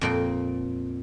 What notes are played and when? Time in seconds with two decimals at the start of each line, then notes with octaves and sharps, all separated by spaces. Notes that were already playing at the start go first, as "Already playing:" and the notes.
0.01 F2 A#2 G5